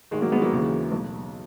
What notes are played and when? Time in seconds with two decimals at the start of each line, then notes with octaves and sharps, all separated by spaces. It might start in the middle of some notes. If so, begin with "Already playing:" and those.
0.11 G#1 G#2 D#3 G#3
0.21 F#3 A#3
0.32 G#3 B3
0.42 F#3 A#3
0.52 D#2 C#3 E3
0.92 B1 B2